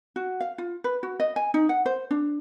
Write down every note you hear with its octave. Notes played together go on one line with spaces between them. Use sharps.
F#4
F5
F4
B4
F#4
D#5
G#5
D#4
F#5
C5
D4